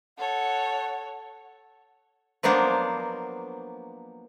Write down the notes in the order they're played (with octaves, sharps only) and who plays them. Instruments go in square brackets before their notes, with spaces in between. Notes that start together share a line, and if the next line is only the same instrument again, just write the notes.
[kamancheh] A4 C#5 [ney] F#5
[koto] F3 F#3 A#3 B3 D4 C5